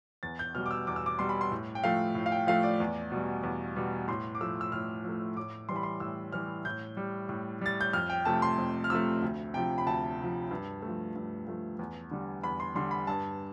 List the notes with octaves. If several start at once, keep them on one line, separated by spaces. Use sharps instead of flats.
E2 A6
G6
B2 G3 F6
D6
E6
E2 D6
E6
D6
B2 G3 C6
B5
C6
A2
G5
F3 A3 F5
A2
F5
G5
F3 A3 F5
D5
E2
B2 G3
E2
B2 G3
A2 C6
D6
F3 A3 E6
E6
A2 F6
F3
A3
A2 D6
E3 G3 C6
B5
C6
A2 E6
E3 G3 F6
A2 G6
G3
A2
G3 A6
G6
F2 F6
G5
C3 F3 A3 A5
C6
F2
F6
C3 F3 A3 E6
D2
C3 F3 G5
B5
D2 A5
C3
F3
G2
A3
F3
G2
F3 A3
E2
D3 G3
E2 B5
C6
D3 G3 C6
B5
G2 A5